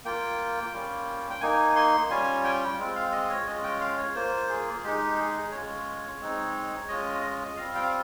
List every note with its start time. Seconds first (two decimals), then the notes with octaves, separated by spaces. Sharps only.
0.05 A#3 F4 G5
0.73 G3 A#3 C#4 F4
1.30 G5
1.41 A#3 D#4 G#5
1.76 C6
2.10 G3 C#4 F4 G#5
2.44 G5
2.78 G#3 C4 F4
2.96 F5
3.12 D#5
3.29 C#5
3.46 G#3 C#4 F4 D#5
3.64 G5
3.81 F5
3.97 C#5
4.15 A#3 F4 C5
4.49 G#4
4.83 G#3 D#4 G4
5.17 G#4
5.51 G#3 C#4 F4 C#5
6.20 G#3 C4 D#4
6.88 G#3 C#4 F4 D#5
7.23 D#5
7.57 G3 C4 F4 F5
7.75 G5
7.83 F5